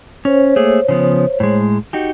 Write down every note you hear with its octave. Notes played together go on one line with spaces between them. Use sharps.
C#4 C5 C#5
A3 A#3 G#4
C#3 F3 B3
A2 G#3
D#4 F#4 G4